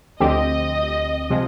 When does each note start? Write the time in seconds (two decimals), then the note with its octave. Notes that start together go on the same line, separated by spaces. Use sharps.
0.20 D2 D3 F3 C4 G4 D#5
1.30 C3 F3 G#3